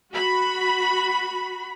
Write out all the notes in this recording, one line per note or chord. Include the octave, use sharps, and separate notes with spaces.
F#4 B5